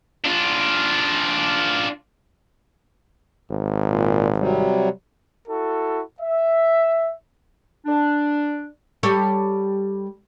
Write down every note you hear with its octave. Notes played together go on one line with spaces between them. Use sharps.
D4 F4
G#1
A#2
C3 F#3 G3
E4 F#4 A4
E5
D4
G3 A4 C#5